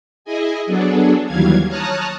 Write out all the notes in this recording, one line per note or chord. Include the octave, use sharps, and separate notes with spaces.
E4 G#4 D#5 G#5
F#3 B3 D4 G#4 A4
D#2 E3 F#3 G3 F5 G#6
C#5 A5 A#5 D#6 F6 F#6